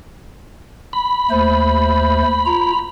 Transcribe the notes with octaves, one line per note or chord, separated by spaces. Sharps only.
B5
D#2 A3 C5
F4 A#5